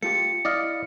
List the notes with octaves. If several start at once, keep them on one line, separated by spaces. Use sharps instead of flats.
A3 F4 G4 C#7
E4 D5 D#5 F5